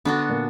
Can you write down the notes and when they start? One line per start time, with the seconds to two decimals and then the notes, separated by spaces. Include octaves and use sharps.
0.05 D3 B3 D4 F#4
0.29 A#2